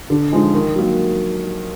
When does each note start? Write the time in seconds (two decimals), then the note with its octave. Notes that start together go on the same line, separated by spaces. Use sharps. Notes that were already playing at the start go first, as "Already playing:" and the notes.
0.10 D3
0.32 F3 G#3 D#4
0.54 D#3
0.76 F#3 A#3